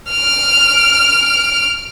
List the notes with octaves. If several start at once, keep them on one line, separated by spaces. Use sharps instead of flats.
F6 D7